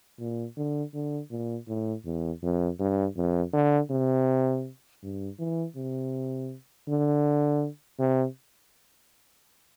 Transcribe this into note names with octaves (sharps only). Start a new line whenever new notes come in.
A#2
D3
D3
A#2
A2
E2
F2
G2
F2
D3
C3
G2
E3
C3
D3
C3